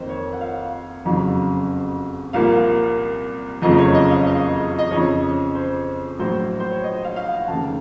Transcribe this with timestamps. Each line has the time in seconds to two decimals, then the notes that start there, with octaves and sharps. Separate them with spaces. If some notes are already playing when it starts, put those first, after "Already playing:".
Already playing: F2 D#3 A#3 C5
0.09 C#5
0.33 F#5
0.41 F5
1.05 F#1 F2 C#3 F#3
2.33 C2 A#2 F3 A#3 F5
3.62 F#1 F2 C#3 F3 A3 D#5
3.78 C#5
3.95 D#5
4.11 F5
4.27 D#5
4.79 D#5
4.91 F2 C#3 F3 C#5
5.55 C5
6.19 A#1 A2 F#3 C5
6.60 C5
6.71 C#5
6.84 D#5
7.05 F5
7.16 F5
7.26 F#5
7.48 F1 D#2 C#3 A3 A5